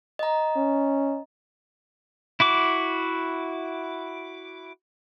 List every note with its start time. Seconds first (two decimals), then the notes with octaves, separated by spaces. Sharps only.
0.19 D#5 A#5
0.56 C#4
2.40 E4 F#4 D6